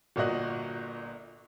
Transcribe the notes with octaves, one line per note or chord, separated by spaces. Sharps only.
G1 A#2 F#4 D#5 F#6